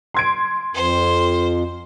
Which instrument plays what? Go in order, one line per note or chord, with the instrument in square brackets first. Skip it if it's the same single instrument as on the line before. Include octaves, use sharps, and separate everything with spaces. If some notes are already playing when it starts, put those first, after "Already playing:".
[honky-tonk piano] C6 G#6 D7
[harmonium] F2 [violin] C5